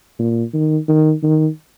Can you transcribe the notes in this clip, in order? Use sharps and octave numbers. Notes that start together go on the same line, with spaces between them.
A#2
D#3
D#3
D#3